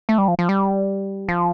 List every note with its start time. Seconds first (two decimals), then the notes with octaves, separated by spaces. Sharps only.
0.09 A3
0.18 G3
0.28 F3
0.39 F3
0.49 G3
1.29 F3